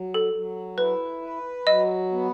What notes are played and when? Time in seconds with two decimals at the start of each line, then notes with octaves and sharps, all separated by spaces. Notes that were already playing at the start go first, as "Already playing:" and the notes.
Already playing: F#3
0.14 A4
0.33 F#3
0.78 E4 B4
1.22 B4
1.67 F#3 D#5
2.12 B3